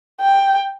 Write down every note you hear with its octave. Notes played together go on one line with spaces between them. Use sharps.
G5